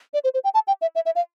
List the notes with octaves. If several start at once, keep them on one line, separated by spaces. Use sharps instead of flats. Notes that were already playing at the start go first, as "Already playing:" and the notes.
D5
C5
C5
G5
A5
G5
E5
E5
E5
F5